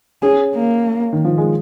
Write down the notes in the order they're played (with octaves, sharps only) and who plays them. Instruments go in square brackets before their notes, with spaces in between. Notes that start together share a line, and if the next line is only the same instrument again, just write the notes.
[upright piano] C#4 [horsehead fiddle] G#4
[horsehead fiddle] A#3
[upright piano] D#3
F3
G#3